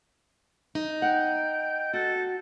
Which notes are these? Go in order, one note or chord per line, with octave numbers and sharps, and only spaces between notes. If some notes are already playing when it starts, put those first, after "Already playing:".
D#4
F#5 G5
F#4 A4